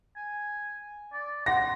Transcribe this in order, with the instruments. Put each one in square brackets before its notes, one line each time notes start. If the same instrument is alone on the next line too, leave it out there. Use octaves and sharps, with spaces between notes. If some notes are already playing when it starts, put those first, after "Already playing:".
[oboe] G#5
D5
[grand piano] F#5 A#6 [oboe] C6